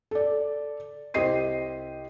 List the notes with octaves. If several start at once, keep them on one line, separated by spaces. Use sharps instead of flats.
A4 D5
C2 G4 C5 D#5 C7 D#7